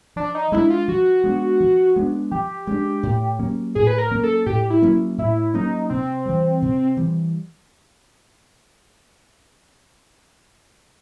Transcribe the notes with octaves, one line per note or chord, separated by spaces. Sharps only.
F3 D4
D#4
G#3 B3 D4 E4
F4
F3 F#4
G#3 B3 D4
F3
G#3 B3 D4
F3 G4
G#3 B3 D4
A2
F#3 A#3 C#4
A2 G#4
B4
A#4
F#3 A#3 C#4
A4
A2 G4
E4
F#3 A#3 C#4
A2 E4
F#3 A#3 C#4 D#4
C3 C4
E3 G3
C3
E3 G3